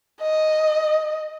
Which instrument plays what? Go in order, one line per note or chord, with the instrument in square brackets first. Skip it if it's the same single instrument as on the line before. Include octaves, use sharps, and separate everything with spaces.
[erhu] D#5